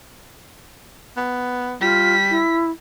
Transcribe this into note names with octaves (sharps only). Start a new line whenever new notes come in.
B3
G3 F4 B6
E4